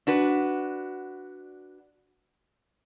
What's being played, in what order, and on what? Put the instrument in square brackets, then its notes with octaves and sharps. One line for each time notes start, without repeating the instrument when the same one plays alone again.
[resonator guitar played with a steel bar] D4 F#4 B4